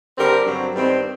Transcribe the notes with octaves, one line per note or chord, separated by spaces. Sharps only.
D3 G3 C4 G4 A#4
G2 D3 F#3 C4
G2 D#3 G3 C4